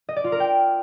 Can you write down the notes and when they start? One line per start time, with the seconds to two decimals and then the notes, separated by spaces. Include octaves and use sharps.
0.09 D#5
0.16 D5
0.24 F4
0.32 A#4
0.40 G5